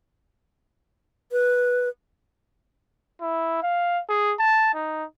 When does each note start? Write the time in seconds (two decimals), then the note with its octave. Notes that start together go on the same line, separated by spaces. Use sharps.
1.32 B4
3.21 E4
3.63 F5
4.09 G#4
4.39 A5
4.74 D#4